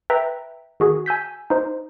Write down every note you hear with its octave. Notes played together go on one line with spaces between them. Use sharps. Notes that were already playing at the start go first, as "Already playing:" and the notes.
B4 E5 G5 A#5
D#3 F#4 G#4
G#5 E6 G6 B6
D#4 C5